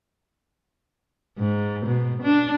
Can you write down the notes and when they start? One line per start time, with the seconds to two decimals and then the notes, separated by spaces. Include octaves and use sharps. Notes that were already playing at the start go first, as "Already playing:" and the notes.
1.39 G#2
1.86 B2
2.23 D4